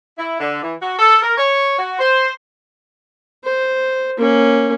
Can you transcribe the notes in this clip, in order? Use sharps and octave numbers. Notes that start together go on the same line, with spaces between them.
E4
D3
E3
F#4
A4
A#4
C#5
F#4
C5
C5
A#3 C#4